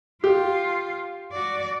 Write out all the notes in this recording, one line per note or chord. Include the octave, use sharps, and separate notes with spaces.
F4 G4
F#4 D5